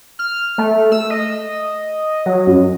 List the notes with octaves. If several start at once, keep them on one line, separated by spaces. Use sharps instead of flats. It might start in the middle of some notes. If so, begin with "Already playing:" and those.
F6
A3
E6
D#5
F#3
F#2